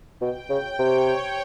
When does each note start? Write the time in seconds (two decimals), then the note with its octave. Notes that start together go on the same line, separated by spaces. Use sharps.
0.20 B2 G5
0.50 C#3
0.79 C3 C#5
1.08 C#5